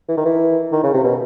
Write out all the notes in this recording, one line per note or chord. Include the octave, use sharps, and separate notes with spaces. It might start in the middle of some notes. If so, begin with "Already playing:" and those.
E3
D#3
E3
D#3
C#3
C3
B2